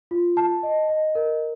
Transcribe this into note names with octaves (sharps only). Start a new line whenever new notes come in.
F4
A5
D#5
D#5
A#4